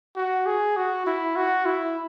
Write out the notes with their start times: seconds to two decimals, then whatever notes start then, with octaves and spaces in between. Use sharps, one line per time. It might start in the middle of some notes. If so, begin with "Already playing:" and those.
0.16 F#4
0.46 G#4
0.77 F#4
1.06 E4
1.36 F#4
1.66 E4